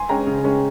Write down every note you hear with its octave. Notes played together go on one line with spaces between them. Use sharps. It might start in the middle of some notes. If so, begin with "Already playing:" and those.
Already playing: G#5 C6
G#3 C#4 G5 A#5
C#3
G#3 C#4